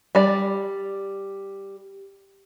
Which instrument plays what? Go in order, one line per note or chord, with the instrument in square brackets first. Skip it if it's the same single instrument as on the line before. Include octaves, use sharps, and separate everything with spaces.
[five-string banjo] G3 D5